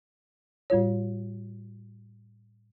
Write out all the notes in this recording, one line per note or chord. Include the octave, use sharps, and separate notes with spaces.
A2 G3 F4 C#5